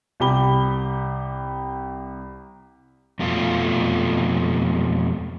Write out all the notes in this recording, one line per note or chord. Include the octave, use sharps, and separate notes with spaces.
C2 G4 B5 G7
F2 B2 A3 F4